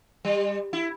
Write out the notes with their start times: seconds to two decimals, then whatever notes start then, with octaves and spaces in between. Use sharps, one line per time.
0.25 G3
0.73 E4